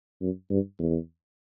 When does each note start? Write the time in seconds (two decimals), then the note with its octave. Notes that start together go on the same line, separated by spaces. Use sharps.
0.21 F#2
0.50 G2
0.79 E2